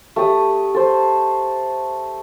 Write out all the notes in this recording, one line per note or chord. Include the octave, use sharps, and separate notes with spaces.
A3 G4 D#6
A4 C5